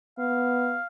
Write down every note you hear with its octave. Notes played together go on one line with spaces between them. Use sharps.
B3 F5